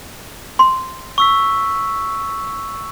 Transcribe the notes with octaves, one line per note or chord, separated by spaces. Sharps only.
C6
C#6 E6 B6